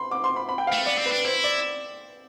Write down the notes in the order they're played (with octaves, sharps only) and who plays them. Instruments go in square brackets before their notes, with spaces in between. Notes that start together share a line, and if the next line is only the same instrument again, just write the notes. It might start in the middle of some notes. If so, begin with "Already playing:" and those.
Already playing: [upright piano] B5 C6
D6
C6
B5
B5
G5
F5
[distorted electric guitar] A3
[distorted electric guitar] B3 [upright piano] D5
[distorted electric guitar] C4
[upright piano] B4
[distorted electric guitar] D4
[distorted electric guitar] E4 [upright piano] C5
[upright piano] D5